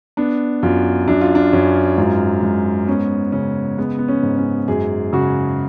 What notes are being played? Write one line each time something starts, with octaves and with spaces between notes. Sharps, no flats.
B3 D4
F#2 F4
F#2 D4
F4
D4
F#2 C#4
G#2 F4
G#2
B3 C#4
C#3 C#4
G#3 B3
B3
C#4
G#2
C#4
F#2 G#4
C#3 F#4